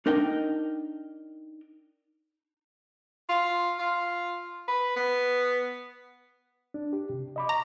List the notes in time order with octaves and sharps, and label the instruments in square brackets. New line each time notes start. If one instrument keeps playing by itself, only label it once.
[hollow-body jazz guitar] D4 D#4 A#4 D#5 G5
[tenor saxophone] F4
F4
B4
B3
[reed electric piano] D4
G4
C3
D#5 B5 D6
[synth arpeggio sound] A#5 [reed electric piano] C#6